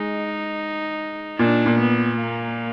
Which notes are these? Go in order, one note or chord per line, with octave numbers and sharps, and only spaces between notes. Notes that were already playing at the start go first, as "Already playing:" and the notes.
Already playing: G#3 D#4
A#2 D4
A#2
B3
A#3